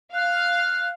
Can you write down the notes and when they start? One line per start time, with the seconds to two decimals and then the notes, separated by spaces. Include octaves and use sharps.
0.14 F5 F#6